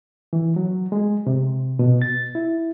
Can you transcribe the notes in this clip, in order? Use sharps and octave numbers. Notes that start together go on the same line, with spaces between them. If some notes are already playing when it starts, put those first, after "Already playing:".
E3
F#3
G#3
C3
B2
A6
E4